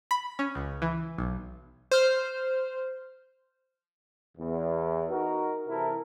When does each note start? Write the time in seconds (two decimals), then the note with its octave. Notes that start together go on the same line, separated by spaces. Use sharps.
0.11 B5
0.39 C#4
0.55 C#2
0.82 E3
1.18 B1
1.91 C5 F6
4.38 E2
5.11 D#4 F#4 A#4
5.68 C3 E3 E4 A4 A#4